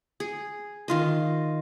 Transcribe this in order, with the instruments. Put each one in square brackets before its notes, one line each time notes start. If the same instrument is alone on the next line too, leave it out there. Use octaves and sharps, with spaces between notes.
[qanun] G#4
D#3 F4 D#5